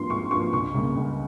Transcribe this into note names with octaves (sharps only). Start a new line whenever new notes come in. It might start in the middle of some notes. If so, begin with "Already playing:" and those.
Already playing: G#1 G2 F3 A#3 C6
G#1 C#6
G2 F3 A#3 C#6
C#2 C#6
C#3 G3 A#3
C#2